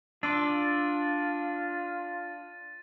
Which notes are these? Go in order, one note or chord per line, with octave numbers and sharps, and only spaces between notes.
D4 F4 C6 D6 E6 A6 D#7